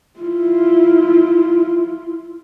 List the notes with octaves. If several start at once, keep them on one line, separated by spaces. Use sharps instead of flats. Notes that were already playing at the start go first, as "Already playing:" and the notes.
E4 F4